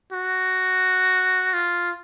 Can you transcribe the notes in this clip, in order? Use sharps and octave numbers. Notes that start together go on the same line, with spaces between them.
F#4
F4